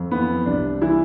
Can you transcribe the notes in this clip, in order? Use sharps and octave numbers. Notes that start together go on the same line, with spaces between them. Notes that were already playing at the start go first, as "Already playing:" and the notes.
Already playing: F2
E3 B3
C2 D4
E3 E4